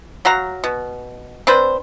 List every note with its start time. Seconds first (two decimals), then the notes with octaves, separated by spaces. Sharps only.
0.25 F#3 F#4 F5 A#5
0.64 B2
1.47 C4 D4 B4 C5